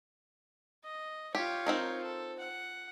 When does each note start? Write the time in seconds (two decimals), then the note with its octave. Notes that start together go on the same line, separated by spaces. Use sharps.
0.84 D#5
1.35 F4 G4 C#5
1.67 C4 D#4 A#4
2.02 A4
2.39 F#5